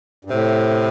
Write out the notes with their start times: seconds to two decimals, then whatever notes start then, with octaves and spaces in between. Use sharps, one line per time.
0.25 G2
0.30 A2 C3